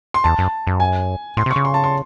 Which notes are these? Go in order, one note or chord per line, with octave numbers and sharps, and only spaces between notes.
C6
E2 A5
F#2
F#2
G#5
A2 C6
C3
C#6
C#3
C6
A5
C6